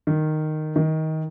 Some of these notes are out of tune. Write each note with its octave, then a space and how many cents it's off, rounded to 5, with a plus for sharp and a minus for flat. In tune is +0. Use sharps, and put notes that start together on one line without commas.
D#3 -10
D#3 +20